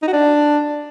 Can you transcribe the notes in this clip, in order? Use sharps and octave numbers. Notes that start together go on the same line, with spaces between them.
D#4
F#4
D4